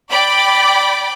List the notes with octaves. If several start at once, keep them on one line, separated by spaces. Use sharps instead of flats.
D5 G5 B5 D6